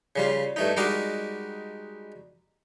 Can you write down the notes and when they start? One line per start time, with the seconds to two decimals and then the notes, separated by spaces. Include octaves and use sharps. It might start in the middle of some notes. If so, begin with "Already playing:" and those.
0.16 C#3 G3 F4
0.56 G2 A3 D#4
0.77 G3 G#3 D#4 F#4 A#4 D6